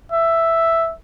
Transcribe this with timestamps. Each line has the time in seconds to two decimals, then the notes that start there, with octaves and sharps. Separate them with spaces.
0.12 E5